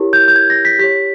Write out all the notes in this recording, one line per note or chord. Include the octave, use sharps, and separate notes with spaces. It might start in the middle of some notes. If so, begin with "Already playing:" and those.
Already playing: E4 G4 A#4 C#5
G6
G6
G#6
A#6
B6
G4 C#5 B6